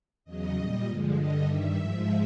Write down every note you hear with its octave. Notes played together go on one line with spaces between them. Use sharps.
E2 C#3 F#3 D#5
A#2 G3
G2 D3 F3 G#3
G2 D3 G3 D#5
G2 D#3 G3 E5
G#2 F3 G#3